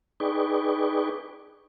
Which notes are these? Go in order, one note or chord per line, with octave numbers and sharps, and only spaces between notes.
D#4 G#4 B4 D5 G5 C#6